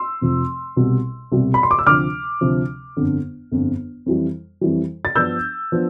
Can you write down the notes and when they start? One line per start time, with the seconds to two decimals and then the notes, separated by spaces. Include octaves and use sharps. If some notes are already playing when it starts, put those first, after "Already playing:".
Already playing: C6 E6
0.21 F1 F2 C3 F3
0.76 C2 B2 G3
1.32 C2 B2 G3
1.54 B5
1.63 C6
1.71 D6
1.79 E6
1.86 D2 C3 F3 D6 F6
2.41 D2 C3 F3
2.97 G1 F2 D3
3.51 G1 F2 D3
4.06 F2 E3 G3
4.61 F2 E3 G3
5.05 A6
5.15 G2 F3 B3 D4 E6 G6
5.72 F3 B3 D4